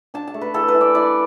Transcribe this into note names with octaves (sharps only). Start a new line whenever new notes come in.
D4 A5
A5
A3
B4
E3 A4
B4
E3
D5
E3 D5